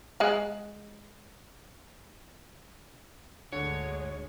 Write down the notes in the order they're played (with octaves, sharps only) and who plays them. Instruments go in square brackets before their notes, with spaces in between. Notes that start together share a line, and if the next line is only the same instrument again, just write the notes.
[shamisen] G#3 F#5
[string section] D2 G#2 G#3 [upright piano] D3 [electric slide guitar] C#5